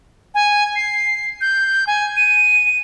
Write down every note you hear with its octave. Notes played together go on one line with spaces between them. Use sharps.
G#5
C7
G6
G#5
D#7